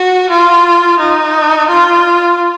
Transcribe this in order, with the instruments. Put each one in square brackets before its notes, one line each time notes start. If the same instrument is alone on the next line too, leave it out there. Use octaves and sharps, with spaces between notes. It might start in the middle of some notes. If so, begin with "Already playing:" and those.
Already playing: [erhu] F#4
F4
D#4
F4